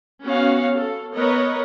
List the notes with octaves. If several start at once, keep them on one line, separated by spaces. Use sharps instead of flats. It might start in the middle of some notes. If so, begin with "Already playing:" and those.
B3 C#4 F#4 C#5 F5
A4
B3 A#4 B4 C#5 D#5